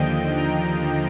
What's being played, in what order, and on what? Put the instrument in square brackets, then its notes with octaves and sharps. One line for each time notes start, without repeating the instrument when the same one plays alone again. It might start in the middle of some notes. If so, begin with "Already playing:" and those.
Already playing: [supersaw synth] D#2 D3 F3 D#5 G5
G5 A#5